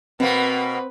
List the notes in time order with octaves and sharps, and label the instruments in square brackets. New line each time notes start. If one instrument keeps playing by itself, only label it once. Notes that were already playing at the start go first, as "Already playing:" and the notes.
[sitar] B2 A#3 [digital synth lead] C4 [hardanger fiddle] B4